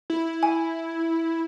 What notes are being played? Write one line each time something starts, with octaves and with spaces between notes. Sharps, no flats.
E4
G#5